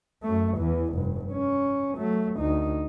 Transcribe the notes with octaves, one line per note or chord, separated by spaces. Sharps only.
F#2 A3
E2 E3
F1 G2
C#4
F#3 A3
D2 D#4